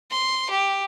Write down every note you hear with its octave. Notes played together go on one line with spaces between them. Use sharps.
C6
G4